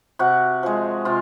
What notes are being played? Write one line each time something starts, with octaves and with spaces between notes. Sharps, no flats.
C3 F#4
F3 G#3
C3 F4